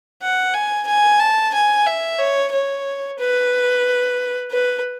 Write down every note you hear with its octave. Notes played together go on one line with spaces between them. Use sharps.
F#5
G#5
G#5
A5
G#5
E5
C#5
C#5
B4
B4